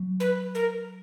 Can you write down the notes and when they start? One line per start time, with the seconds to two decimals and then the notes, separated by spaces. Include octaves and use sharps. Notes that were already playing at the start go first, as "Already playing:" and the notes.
Already playing: F#3
0.20 B4
0.55 A#4